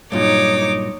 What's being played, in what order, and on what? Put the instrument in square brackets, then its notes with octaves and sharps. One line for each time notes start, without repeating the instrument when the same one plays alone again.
[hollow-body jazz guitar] G2 A#2 F#3 [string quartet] D#4 C#5 D6